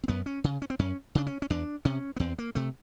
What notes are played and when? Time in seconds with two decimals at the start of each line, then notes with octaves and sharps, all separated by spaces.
0.04 C4
0.08 F#2 B3
0.26 C#4
0.44 C#3
0.62 C#4
0.70 C4
0.79 F#2 C#4
1.15 C#3 D4
1.27 C#4
1.42 C#4
1.50 E2 D4
1.85 C3 C#4
2.16 B3
2.20 E2 C4
2.38 A#3
2.55 C3 A3